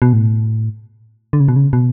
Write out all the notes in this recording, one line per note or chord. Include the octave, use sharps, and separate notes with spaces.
B2
A2
D3
C#3
B2
C#3
B2